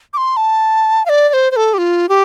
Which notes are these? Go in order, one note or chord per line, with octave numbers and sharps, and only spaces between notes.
D6
C6
A5
F5
D5
D5
C5
C5
A4
G4
F4
G4